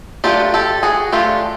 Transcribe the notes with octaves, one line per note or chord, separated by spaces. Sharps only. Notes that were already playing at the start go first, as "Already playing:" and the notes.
F#3 A3 D4 F4 G4
G4 A4
F#4 G#4
F#3 A3 D4 F4 G4